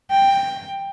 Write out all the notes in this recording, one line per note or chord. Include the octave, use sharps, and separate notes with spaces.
G5